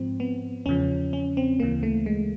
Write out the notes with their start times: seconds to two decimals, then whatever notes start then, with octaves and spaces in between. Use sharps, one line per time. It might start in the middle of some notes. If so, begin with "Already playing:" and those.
Already playing: G#2 F3 C4
0.20 B3
0.66 E2 C#3 F3 C#4
1.13 C#4
1.37 C4
1.60 D2 C#3 E3 A#3
1.83 A3
2.06 G#3